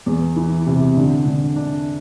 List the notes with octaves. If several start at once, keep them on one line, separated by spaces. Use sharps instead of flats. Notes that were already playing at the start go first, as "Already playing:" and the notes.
E2
E3
C3
D3
D3
D4